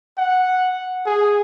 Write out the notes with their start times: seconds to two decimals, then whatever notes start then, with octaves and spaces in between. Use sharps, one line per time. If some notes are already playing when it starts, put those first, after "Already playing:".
0.18 F#5
1.06 G#4